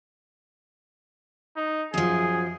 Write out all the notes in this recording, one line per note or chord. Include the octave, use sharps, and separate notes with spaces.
D#4
F#2 F3 G#4